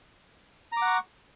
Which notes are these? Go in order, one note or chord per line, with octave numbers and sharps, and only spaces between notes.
F#5 A#5 C#6 D6